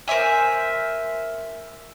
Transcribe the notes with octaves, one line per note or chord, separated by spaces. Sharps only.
A#4 C5 E5 G#5